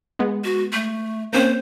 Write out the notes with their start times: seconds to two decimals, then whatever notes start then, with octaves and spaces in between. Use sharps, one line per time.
0.19 G#3 B3
0.44 F#4
0.73 A3
1.33 A#3 C4 C#4 C5